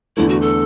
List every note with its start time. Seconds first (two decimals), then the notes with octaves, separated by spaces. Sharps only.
0.17 E2 D3 A3 E4
0.29 F#4
0.41 A4